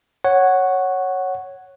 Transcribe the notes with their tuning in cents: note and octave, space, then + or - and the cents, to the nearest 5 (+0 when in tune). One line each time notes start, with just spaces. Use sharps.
C#5 -5 F#5 +5